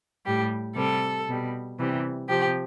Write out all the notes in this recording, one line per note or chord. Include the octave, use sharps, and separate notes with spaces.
A2 G3 G4
C3 G3 A4
B2 G3
C3 E3 G3
C3 F3 G4